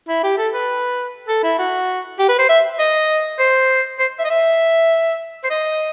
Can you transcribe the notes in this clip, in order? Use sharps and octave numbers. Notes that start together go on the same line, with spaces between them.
E4
G4
A4
B4
A4
E4
F#4
G4
B4
C5
E5
D#5
C5
C5
E5
D#5
E5
C5
D#5